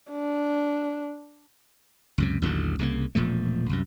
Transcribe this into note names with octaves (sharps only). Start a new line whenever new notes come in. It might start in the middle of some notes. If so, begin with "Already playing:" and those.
D4
C#2 F#2 C3
A1 D#2 D3 F#3
C2 C#3 G3 A#3
E1 A#2 F3 A3
C2 F#2